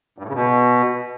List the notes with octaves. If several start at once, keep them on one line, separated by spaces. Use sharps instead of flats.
G2
A2
C#3
B2